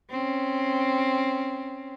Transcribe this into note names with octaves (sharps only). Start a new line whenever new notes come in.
C4 C#4